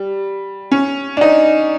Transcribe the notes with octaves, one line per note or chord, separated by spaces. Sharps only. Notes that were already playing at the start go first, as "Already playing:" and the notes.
Already playing: G3
C#4
D4
D#4